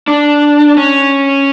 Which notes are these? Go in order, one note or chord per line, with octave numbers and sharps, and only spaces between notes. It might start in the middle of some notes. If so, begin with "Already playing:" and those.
D4
C#4